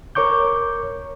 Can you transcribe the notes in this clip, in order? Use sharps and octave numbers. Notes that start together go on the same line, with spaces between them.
A#4 C#5 C#6 D6 G6